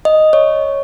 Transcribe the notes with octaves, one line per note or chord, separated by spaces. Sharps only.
D#5
C#5